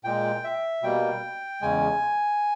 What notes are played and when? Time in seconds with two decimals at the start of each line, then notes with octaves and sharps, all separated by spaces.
0.04 A#2 G#3 G5
0.44 E5
0.83 B2 G3 A#3 G5
1.61 E2 C#3 G#3 G#5